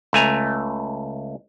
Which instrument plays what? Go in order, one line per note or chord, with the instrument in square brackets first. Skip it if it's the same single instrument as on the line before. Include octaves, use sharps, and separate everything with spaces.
[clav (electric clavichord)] C#2 A3 G#5 A#5